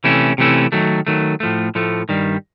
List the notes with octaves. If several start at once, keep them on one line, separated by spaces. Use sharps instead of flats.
C3 E3 A3 C#4 E4
C3 E3 A3 C#4 E4
D#3 F#3 A3
D#3 F#3 A3
A2 F3 A3
A2 F3 A3
G2 D#3 G3